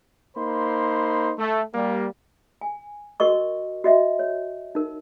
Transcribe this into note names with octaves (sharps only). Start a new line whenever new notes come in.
A#3 D#4 C5 B5 C6
A3
G3 A#3
G#5
F#4 A#4 D#5 C#6
F#4 D#5 E5
C#5
D#4 A#4